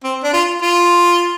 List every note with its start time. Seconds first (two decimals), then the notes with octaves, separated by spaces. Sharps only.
0.04 C4
0.24 D4
0.33 F4
0.62 F4